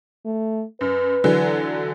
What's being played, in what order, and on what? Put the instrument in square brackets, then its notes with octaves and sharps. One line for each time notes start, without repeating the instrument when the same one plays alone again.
[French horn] A3
[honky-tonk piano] F#2 [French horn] B4
[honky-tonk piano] D3 E3 F#3